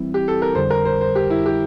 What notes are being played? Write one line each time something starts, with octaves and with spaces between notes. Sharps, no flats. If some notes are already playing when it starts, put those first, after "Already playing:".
Already playing: E3 G3 C4 E4
G4
A4
A#4
F2 D3 G3 C5
A#4
C5
C5
G4
E4
G4